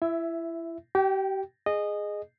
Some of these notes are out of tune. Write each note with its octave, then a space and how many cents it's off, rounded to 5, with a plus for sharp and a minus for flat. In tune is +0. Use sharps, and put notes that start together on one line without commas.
E4 +25 E5 +0
G4 -35 G5 +0
G#4 +0 D#5 -15